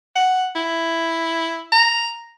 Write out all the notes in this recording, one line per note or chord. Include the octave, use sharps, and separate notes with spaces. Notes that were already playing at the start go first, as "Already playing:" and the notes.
F#5
E4
A#5